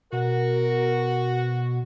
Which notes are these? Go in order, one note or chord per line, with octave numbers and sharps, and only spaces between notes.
B2 F#4 A#4